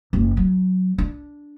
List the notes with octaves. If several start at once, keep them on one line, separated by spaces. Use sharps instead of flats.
F#1
F#3
D4